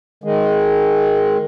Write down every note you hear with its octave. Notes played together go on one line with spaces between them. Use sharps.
D#3 G#3